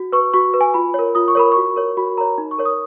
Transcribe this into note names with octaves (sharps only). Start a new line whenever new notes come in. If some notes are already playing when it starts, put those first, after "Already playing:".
Already playing: F#4
B4 C#6
F#4 C#6
B4
G#5
F4 B5
A#4 C#5
F4 D#6
C#6
A#4 C#5 B5
F#4 C#6
A#4 C#5
F#4 B5
A#4 C#5 A#5
D#4
C#6
A#4 C#5
D#6